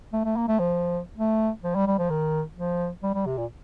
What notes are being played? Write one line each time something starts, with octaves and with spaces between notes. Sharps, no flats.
A3
A3
A#3
A3
F3
A3
F3
G3
G3
F3
D#3
F3
G3
G3
C3
A#2